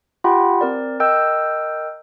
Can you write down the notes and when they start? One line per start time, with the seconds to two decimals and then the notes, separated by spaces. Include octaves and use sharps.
0.24 F4 G4 F#5 G5 B5
0.61 C4 A#4 D5
1.00 A#4 D#5 G5 E6 G6